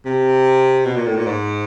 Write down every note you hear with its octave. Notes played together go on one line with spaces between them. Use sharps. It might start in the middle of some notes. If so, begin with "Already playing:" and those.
C3
B2
A#2
A2
A#2
G#2